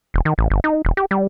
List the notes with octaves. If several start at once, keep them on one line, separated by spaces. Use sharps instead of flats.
E1
D#3
A1
G1
D#4
E1
G4
G3